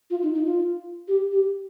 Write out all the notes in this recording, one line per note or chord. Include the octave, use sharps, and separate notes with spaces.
F4
D#4
D#4
F4
G4
G4